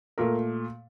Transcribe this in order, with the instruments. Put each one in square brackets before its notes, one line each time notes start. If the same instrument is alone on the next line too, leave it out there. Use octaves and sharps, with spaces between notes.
[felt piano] A#2 A3 A#4